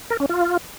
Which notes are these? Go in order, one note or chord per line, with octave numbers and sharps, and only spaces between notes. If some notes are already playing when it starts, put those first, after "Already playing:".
A#4
C#4
F4